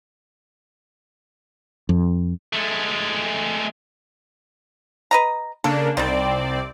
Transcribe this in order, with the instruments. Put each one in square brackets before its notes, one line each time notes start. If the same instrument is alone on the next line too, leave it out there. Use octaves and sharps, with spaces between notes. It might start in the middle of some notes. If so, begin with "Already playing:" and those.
[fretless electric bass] F2
[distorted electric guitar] G#3 A3
[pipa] B4 D#5 A#5
[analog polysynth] C#3 A#3 D4 [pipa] A4
[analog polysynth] C2 C4 D5 [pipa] D#3 G3